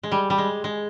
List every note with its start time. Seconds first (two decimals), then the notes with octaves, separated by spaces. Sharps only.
0.03 G#3
0.12 G3
0.30 G3
0.38 G#3
0.64 G#3